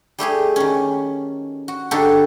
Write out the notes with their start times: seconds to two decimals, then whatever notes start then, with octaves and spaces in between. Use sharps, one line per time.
0.18 G3 A3 G4 G#4
0.56 D#3 C#4
1.68 F#4
1.91 D3 D4 D#4 F#4 G4 A4